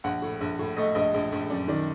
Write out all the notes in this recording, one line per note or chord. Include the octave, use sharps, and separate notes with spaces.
A#1 F#5
A2
A#1
A2
A3 D#5
A#1 D#5
A#1
A#1
F#2 D5
D#3 D5